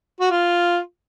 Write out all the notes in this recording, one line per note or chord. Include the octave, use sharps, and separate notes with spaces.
F#4
F4